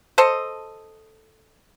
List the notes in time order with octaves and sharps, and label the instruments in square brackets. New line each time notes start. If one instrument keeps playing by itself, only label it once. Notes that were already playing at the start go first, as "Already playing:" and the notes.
[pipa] A4 C5 D#5